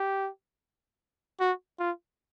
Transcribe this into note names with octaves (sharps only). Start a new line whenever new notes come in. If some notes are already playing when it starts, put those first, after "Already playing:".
Already playing: G4
F#4
F4